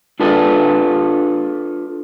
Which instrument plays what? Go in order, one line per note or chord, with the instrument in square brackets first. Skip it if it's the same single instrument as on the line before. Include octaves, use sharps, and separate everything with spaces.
[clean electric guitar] D4 F4 A4 B4 D5